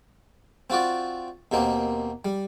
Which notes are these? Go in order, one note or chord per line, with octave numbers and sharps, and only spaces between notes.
C4 F4 F#4 D5
D#2 B2 A#3 C4
G3